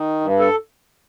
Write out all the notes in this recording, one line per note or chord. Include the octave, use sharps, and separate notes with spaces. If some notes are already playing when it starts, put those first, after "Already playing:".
Already playing: D#3
G2
A4